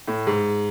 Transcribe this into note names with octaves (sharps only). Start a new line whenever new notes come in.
A2
G#2